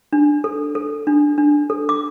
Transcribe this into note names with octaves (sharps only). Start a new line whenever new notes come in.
D4
A4
A4
D4
D4
A4
D6